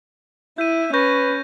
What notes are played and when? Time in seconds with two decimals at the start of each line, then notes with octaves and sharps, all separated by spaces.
0.58 E4 E5 G6 D#7
0.93 C#4 B4 C#6 G6 A#6